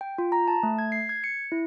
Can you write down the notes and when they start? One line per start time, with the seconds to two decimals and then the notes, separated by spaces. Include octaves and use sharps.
0.01 G5
0.18 F4
0.32 A#5
0.48 A5
0.63 A3
0.79 G#6
0.92 C7
1.09 G#6
1.24 C#7
1.52 E4